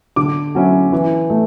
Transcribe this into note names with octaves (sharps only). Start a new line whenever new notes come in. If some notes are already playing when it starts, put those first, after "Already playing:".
D3 D6
F#3 C#4 E4
E3
A3